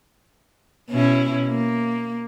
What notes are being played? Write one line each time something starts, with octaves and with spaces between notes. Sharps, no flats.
B2 C#4 E4
A#3